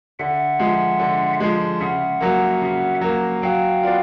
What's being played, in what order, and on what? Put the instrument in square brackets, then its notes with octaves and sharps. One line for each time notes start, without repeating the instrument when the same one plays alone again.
[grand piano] D3 [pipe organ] E5 F#5
[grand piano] F3 G#3
D3
F3 G#3
[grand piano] C#3 [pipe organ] E5 F#5
[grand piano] F#3 A#3
C#3
F#3 A#3
[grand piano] F#3 [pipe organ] F5 G5
[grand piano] B3 D4 F4